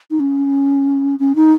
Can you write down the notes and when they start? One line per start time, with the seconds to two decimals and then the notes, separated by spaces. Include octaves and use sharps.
0.11 D#4
0.20 C#4
1.19 C#4
1.35 D#4